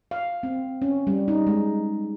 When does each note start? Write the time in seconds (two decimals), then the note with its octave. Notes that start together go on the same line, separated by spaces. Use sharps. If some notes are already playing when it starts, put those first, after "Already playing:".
0.11 F5
0.43 C4
0.82 C#4
1.07 G3
1.28 D#4
1.47 G#3